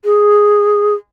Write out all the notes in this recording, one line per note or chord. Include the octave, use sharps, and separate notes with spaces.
G#4